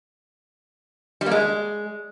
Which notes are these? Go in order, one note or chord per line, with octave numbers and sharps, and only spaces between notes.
G3
A#3
G#3